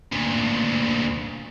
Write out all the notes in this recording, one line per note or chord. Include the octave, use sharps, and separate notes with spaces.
D2 A#2